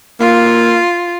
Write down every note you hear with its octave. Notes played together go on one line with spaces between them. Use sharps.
A#3 F4